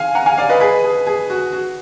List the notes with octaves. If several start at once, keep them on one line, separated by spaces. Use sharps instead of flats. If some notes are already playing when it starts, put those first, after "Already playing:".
Already playing: F5 G#5
F#5 A#5
F5 G#5
D5 F5
B4 D#5
G#4 B4
G#4
G#4
F#4
F#4